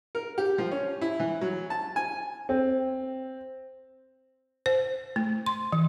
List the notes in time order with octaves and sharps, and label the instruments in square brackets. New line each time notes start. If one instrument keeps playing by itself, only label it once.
[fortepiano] A#4
G4
F3
C#4
E4
E3
F#3
A5
G#5
[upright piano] C4
[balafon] C5
A3
C6
E3